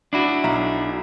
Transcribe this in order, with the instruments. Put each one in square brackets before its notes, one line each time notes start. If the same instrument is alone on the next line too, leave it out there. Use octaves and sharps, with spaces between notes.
[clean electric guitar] D4 E4 F#4
[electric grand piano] B1 E5 A#5